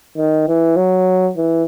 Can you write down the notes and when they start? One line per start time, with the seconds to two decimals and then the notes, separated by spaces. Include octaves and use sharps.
0.17 D#3
0.47 E3
0.76 F#3
1.37 E3